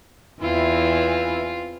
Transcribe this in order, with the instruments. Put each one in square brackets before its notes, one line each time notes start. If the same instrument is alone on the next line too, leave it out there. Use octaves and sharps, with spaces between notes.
[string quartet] E2 E3 G#5 [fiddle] C4 F4 [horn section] E4